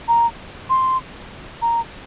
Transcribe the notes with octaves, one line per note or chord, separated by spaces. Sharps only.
A#5
C6
A#5